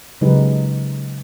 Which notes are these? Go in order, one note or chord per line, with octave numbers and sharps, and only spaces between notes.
C#3 F#3 G#3 D#4 G4 B4